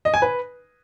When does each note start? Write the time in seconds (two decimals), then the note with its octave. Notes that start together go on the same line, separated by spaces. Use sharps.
0.05 D#5
0.14 G#5
0.22 B4